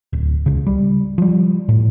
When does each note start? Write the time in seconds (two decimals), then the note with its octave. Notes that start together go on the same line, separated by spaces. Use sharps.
0.13 D1
0.46 C#2 C#3
0.66 G3
1.18 F3 G3
1.69 A2